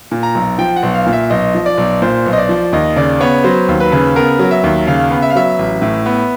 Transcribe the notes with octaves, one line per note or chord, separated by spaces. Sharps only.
A#2
A#5
B1
F3 G5
F#5
B1
F5
A#2
E5
B1 D#5
F3
D5
B1
A#2 C5
B1
D#5
D5
F3
D#2 D#5
C#3 D5
B3 C#5
F#3 C5
D#2
B4
C#3
B3 A#4
F#3
E5
D#2
C#3 F5
B3
E5
F5
F#3 E5
A1
A2
B3